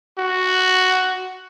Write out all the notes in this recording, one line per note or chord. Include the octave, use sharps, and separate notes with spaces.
F#4